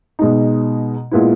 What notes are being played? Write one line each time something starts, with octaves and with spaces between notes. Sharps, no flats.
B2 G#3 D#4
A#2 G#3 B3 E4